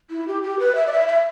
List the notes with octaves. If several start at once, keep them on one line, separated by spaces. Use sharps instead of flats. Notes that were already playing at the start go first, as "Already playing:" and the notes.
E4
G4
G4
B4
E5
D5
E5
E5